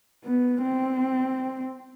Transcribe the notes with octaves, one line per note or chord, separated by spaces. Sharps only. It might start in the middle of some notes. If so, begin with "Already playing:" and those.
B3
C4